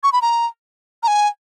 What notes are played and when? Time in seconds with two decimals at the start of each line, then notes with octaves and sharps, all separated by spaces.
0.03 C#6
0.13 B5
0.22 A#5
1.03 A#5
1.08 G#5